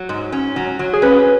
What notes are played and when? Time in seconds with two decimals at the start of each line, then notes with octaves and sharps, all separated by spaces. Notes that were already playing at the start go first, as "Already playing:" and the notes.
Already playing: F#3
0.09 G#2
0.32 C#4
0.56 F#3
0.79 F#3
0.94 G#4
1.02 C#4 B4